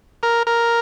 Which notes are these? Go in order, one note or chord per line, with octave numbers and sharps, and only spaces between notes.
A#4
A#4